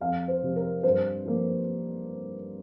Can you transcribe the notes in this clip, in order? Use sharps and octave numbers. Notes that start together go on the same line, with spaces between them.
F2 F5
C5
C3 F3 C4
A#4
G2 C5
F3 A#3